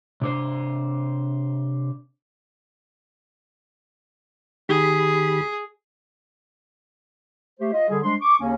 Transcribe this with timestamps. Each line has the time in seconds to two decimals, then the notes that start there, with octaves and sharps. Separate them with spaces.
0.21 C3 D4 C5
4.69 D#3 G4 G#4 B5
7.60 A3 G4 C5
7.72 F4 D#5
7.89 D3 G3 G#4
8.03 G3 G#3 D4 C5 C6
8.21 C#6 D6
8.40 D#2 C#3 A#3 C#4